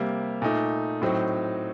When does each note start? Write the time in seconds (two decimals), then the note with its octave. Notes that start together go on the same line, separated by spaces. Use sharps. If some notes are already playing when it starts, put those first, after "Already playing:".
Already playing: C3 G3 A#3
0.42 A#2 A3 D#4
1.02 A2 F#3 C4 D#4